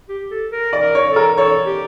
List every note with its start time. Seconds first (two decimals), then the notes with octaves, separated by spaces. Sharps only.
0.09 G4
0.31 A4
0.52 A#4
0.73 D5
0.80 A#4
0.95 C#5
1.09 A4
1.16 A#4
1.37 A4 C#5
1.66 G4